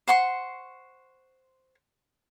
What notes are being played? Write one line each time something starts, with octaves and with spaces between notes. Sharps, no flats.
C5 F#5 C6 C#6